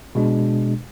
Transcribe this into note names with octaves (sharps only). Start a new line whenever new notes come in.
B2 G#3 D4